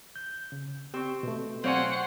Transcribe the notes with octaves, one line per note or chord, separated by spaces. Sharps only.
G6
C#3
C4 G4 C#6
B2 A3
F#3 C4 C5 C#5 F5 F#5 G#5 C6